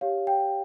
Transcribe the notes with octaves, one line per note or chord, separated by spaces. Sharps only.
G4 C#5 F5
G5